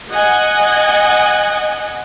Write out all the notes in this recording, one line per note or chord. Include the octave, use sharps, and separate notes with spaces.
D#5 F#5 G#5